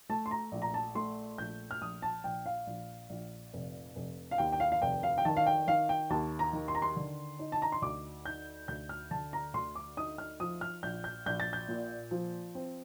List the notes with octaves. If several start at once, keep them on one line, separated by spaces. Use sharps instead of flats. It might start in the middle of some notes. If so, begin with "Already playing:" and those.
A3 A5
C6
A#5
A#1
A#5
A5
A3 C6
A#1 G6
F6
A#1 D#6
A5
A#1 G5
F5
A#1
A#1
F1
F1
F5
D#2 G5
G5
F5
F5
F1 G5
F5
G5
D#3 A5
F5
G5
D#3 F5
G5
D#2 A5
A#5
D#3
C6
A#5
C6
D3
D#4
A5
A#5
C6
D2 D6
D#4 G6
D2 G6
F6
D3 A5
A#5
D2 C6
D6
D#4 D#6
F6
F3 D#6
F6
A#1 G6
G6
A#1 G6
A6
G6
A#2
F3
C4